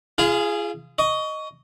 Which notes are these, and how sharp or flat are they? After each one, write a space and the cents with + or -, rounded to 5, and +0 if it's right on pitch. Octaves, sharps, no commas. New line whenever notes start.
F4 -40 G#4 +0 F5 +0
D#5 +0 C#6 +25